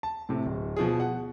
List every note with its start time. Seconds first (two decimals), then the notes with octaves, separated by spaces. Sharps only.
0.03 A5
0.29 A2 C3
0.46 D1
0.77 B2 F3 G#4
1.00 F#5